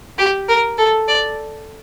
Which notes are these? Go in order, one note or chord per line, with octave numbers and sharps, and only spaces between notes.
G4
A#4
A4
D5